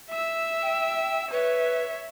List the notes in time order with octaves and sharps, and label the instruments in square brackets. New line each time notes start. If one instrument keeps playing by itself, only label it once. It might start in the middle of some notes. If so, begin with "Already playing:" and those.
[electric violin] E5 E6
[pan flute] G5
[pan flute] B4 [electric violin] C#5 E5